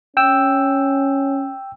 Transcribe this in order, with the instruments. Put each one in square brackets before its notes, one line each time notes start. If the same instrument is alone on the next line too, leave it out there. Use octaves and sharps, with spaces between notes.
[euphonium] C#4 [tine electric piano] G5 E6